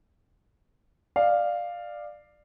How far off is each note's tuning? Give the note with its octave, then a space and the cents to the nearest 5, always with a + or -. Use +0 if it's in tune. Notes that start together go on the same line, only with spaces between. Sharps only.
D5 +15 F5 +0